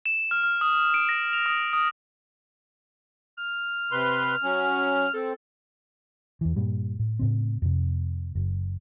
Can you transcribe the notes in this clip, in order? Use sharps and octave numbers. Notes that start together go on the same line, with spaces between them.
E7
F6
F6
D#6
D7
A#6
F7
D#6
D#6
F6
C3 B4 C6
F#3 C#4
C4 A4
E2 E3
G2 A#2 G3
A2
A2 C#3 C4
F2 C3
F#1